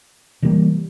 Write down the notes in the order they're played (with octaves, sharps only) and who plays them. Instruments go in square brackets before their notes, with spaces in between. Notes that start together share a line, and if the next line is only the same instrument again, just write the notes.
[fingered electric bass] C#3 E3 G3 A#3